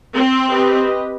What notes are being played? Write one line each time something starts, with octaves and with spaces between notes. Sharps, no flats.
C4
G4 B4 D#5